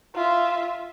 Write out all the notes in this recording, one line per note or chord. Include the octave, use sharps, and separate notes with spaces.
F4 E5